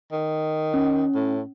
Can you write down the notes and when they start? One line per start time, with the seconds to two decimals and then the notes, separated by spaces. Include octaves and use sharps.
0.12 D#3
0.74 C#4
1.15 A2